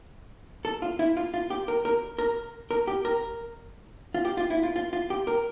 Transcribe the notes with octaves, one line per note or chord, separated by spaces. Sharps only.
A4
F4
E4
F4
F4
G4
A#4
A#4
A#4
A#4
G4
A#4
F4
G4
F4
E4
F4
F4
F4
G4
A#4